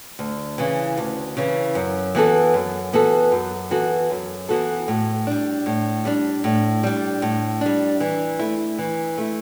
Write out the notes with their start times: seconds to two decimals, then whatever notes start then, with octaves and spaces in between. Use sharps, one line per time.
0.19 D2
0.58 C#3 E3
0.97 D2
1.37 C#3 E3
1.75 F#2
2.15 E3 B3 F#4 A4
2.54 F#2
2.93 E3 B3 F#4 A4
3.32 F#2
3.71 E3 B3 F#4 A4
4.10 F#2
4.49 E3 B3 F#4 A4
4.88 A2
5.27 G3 D4
5.66 A2
6.05 G3 D4
6.44 A2
6.83 G3 D4
7.22 A2
7.61 G3 D4
8.00 E3
8.39 A3 E4
8.79 E3
9.18 A3 E4